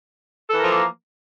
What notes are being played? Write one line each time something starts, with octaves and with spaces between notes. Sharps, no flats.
E3 F3 A#3 A4 A#4